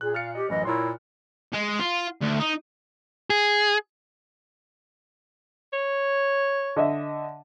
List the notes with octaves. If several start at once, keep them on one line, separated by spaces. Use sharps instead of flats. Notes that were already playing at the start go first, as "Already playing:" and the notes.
A#2 G#4 F#6
F5 F6 A6 C#7
G4 D#5
A1 F#2 E3 D#5
A#2 E4 A#4 C#5 C6
G#3
F4
D2
D#4
G#4
C#5
D3 D#5 E5